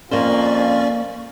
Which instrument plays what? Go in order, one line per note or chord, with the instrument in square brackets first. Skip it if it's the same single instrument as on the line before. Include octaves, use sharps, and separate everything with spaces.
[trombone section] F2 A#2 F4 [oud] A#3 C5 [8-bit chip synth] C#4 D5 C#6